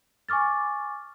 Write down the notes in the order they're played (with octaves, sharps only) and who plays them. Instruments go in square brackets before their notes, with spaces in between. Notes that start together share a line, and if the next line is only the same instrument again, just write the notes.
[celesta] G#5 C#6 D6 F6 A6